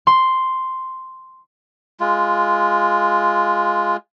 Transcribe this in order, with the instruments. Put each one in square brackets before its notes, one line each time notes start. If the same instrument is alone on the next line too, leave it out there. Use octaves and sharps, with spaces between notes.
[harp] C6
[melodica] G#3 F4